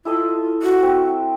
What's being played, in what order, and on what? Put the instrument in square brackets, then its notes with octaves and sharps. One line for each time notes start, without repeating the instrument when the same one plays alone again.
[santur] E4 A4 D#5 [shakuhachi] F4
[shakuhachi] F#4 [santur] E5
[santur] C4